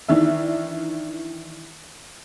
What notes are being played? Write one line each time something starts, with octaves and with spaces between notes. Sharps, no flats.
D#3 E3 D4 E5